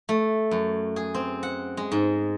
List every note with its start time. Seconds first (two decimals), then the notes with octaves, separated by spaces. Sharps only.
0.09 A3
0.51 F#2
0.96 G#4
1.15 C4
1.43 F#5
1.77 G#3
1.92 G#2